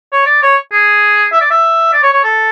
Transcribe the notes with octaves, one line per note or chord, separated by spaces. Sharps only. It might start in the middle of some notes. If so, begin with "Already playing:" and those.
C#5
D5
C#5
G#4
E5
D5
E5
D5
C#5
C#5
A4